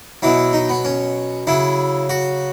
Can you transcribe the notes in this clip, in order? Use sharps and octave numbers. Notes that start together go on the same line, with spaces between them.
B2 F#3 E4
D#4
B3
C#4
C#3 F#3 E4
F#4